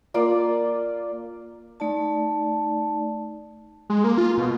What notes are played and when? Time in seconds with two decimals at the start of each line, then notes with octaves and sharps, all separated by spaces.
0.14 A#3 F4 D5
1.80 A3 D#4 D5 A5
3.90 G#3
4.04 A#3
4.18 F4
4.38 B2